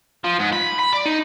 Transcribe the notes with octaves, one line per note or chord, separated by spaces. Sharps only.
F3
G#2
B5
B5
D5
D#4